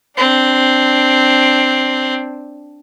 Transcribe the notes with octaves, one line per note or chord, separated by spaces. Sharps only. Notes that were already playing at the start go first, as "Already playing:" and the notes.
C4 D4